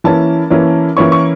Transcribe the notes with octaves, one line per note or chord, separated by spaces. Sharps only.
E3 A#3 C#4 E4 A5
E3 A#3 C#4 E4
E3 A#3 C#4 E4 C#6
C#6